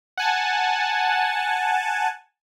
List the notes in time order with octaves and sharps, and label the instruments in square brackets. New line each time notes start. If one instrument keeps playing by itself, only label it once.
[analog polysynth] F#5 G#5 A5